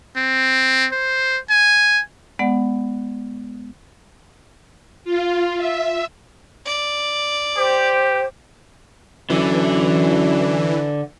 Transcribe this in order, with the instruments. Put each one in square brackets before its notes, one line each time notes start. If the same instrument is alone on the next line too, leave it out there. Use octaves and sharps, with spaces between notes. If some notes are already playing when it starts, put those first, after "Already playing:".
[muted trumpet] C4
C5
G#5
[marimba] G#3 B3 D5 F#5
[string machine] F4
E5
[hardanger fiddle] D5
[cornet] G4 [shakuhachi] C5
[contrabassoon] F#2 [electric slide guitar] D3 [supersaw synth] E3